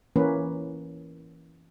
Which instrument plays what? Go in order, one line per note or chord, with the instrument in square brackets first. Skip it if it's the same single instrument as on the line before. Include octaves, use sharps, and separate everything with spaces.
[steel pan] E3 A#3 C#4 B4